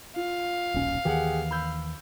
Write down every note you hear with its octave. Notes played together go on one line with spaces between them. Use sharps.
F4 F5
D#1 B1 C#4
D#2 D#3 E3 G4 G#4 F#5
B5 E6 G6